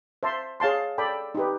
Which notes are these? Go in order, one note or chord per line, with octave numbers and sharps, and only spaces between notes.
C5 E5 A5 C6
G#4 C#5 F5 A5 C6
A4 D5 G5 B5
D#4 G4 B4